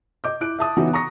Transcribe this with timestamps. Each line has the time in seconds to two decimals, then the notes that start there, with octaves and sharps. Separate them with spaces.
0.24 D#5 D6 G6
0.41 E4 F#6 D7
0.59 E5 A5 D#6
0.77 C#3 E3 B3 C#4 D#4 F#4
0.93 A#5 C#6 D#6 A#6